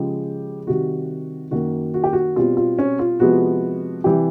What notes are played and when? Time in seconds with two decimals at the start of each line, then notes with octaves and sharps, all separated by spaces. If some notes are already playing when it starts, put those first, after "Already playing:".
Already playing: C#3 F3 G#3 G4
0.67 C3 D#3 G3 F#4
1.51 F#2 D#3 F#3 A#3 F#4
1.94 F#4
2.04 G4
2.13 F#4
2.36 B2 G3 C4 F4
2.57 F4
2.79 C#4
2.99 F4
3.20 C3 F3 G#3 B3 F#4
4.04 C3 E3 G3 G4